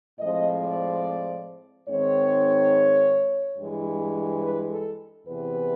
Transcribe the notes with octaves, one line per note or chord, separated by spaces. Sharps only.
A2 F3 G#3 C4 D#5
D5
G#2 D#3 G#3 C4 C#5
G2 E3 G#3
B4
A4
E2 C3 E3 B4